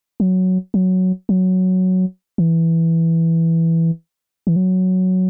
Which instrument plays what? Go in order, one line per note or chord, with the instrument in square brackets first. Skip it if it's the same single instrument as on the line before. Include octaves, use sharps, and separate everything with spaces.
[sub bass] F#3
F#3
F#3
E3
E3
F#3